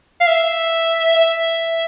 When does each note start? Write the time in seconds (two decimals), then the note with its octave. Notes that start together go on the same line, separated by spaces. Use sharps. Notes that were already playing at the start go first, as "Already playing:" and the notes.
0.20 F5
0.27 E5
1.17 E5